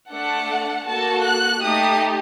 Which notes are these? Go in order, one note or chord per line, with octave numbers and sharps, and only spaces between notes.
A3 D4 A4 F#5
A#3 F#4 A4 A5
F#6
A3 D#4 G4 D#6